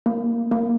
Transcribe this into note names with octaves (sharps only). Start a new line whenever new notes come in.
A#3
A#3